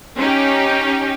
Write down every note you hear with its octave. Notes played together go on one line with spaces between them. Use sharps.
C#4 D#4 G4